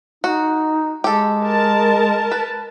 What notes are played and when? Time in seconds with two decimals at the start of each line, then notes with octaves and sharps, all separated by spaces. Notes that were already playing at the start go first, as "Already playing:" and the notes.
0.24 D#4 F#4
1.04 G#3 G4 A4
1.42 A#4 A5
2.31 B4